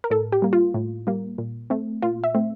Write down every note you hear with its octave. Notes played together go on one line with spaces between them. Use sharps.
A#4
A2 A4
G4
G3 A#3
F4
A2
G3 A#3
A#2
A3 C4
A#2 F4
E5
A3 C4